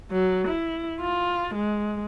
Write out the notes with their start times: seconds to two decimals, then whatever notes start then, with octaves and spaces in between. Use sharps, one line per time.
0.11 F#3
0.47 E4
1.01 F4
1.55 G#3